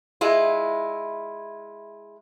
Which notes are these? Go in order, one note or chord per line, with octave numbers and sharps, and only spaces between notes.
G#3 E4 F4